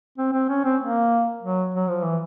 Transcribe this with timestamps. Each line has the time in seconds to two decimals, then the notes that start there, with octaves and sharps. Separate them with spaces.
0.18 C4
0.33 C4
0.49 C#4
0.65 C4
0.81 A#3
1.43 F#3
1.75 F#3
1.88 F3
2.03 E3